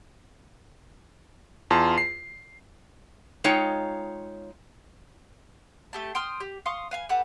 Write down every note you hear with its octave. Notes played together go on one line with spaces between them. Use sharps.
E2 F4 A5 C6
C7
G#3 D#4 F4 C#5 G5
A3 G4 A5
G5 C6 D#6 F6
G4
F5 C6 C#6 D#6
B4 F5 G#5
G4 A4 B4 F#5